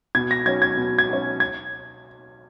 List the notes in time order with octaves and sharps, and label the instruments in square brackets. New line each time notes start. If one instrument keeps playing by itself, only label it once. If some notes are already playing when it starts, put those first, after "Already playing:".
[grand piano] B2 G#6
A#6
F#3 C#4 G#6
G#6
B2
G#6
F#3 C#4
G#6